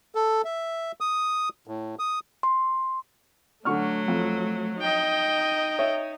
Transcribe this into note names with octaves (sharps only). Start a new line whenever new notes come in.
A4
E5
D#6
A2
D#6
C6
D3 F#3 A3 C#6 F6
F2
D#4 D#5 G5
C#5 E5